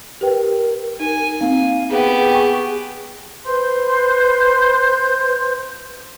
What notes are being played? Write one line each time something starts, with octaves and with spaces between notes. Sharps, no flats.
G4 A#4 B4 G5
D#4 G#5
A#3 C4 D#4 F5
B3 G4 G#4
G5 G#5 C#6
B4 C5 C6 G6